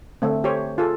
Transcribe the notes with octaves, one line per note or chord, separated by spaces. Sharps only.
D3 A3 C4
G4 C5 C#5
F4 G#4 A4